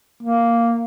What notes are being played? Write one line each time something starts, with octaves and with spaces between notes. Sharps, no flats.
A#3